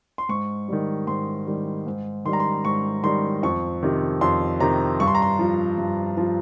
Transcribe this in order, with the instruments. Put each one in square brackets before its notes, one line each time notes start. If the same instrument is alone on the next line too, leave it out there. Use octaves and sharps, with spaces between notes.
[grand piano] C6
G#2 C#6
D#3 G3
G#2 C6
D#3 G3
G#2
D#3 G3 C6
A#5
C6
G#2 C#6
D#3 G3 C6
F2 C#6
C3 D#3
F2 C6
C3 D#3 A#5
G2 C#6
C6
A#5
C6
F3
G2
F3